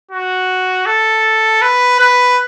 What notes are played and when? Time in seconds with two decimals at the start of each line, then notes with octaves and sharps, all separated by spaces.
0.11 F#4
0.86 A4
1.62 B4
1.99 B4